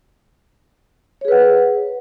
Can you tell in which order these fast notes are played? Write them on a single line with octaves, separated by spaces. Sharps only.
C#5 G#4 B4 F#5